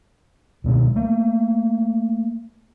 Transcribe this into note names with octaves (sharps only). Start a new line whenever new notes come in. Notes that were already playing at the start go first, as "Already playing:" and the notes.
C#2 B2 G#3
A3 A#3